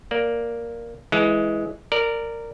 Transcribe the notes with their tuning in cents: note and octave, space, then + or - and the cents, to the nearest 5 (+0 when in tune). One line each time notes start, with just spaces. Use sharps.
A#3 +0 D5 -10
E3 +0 G#3 +10
A#4 -15 D5 +0